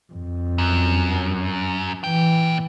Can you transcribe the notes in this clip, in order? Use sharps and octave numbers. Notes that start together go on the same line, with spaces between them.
F2
F#2
A#2 E3 G5